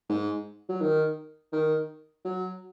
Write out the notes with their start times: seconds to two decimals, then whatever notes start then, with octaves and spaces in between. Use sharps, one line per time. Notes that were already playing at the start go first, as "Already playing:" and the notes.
0.09 G#2
0.69 F#3
0.81 D#3
1.53 D#3
2.25 F#3